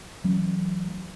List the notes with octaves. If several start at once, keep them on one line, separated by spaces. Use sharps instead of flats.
E3 F#3 A3 C#4